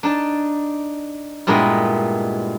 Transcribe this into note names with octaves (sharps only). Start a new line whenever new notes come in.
D4 D#4 A5
G2 A#2 G#3 B3 E4 D#5